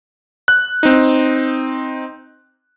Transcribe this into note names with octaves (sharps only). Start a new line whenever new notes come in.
F#6
C4 D#4